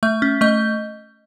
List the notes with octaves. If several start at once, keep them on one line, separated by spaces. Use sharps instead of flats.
A3 E5
C#4
A3 D#5